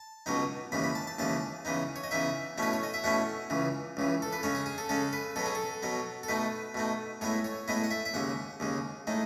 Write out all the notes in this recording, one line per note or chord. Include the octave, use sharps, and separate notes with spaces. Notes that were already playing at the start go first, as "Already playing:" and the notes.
Already playing: A5
C#2 B2 F#3 B3 D#4
D#2 C#3 E3 G#3 B5
B5
A5
A5
D#2 C#3 E3 G#3 A5
C#3 E3 B3 D#4
C#5
D#5
C#3 E3 B3 D#4 E5
B2 A3 C#4 E4 B4
C#5
D#5
E5
B2 A3 C#4 E4 F#5
C#2 C#3 E3
C#2 C#3 E3
A4
B4
C#3 G#3 C#4 C#5
G#4
G#4
A4
C#3 G#3 C#4 A4
B4
B2 F#3 B3 A4
G#4
A4
B2 F#3 B3
A4
B2 A3 D#4 B4
B2 A3 D#4
A2 G#3 B3 E4 C#5
C#5
A2 G#3 B3 E4 D#5
F#5
E5
E5
D#2 C#3 G#3 F#5
D#2 C#3 G#3
A2 G#3 D#4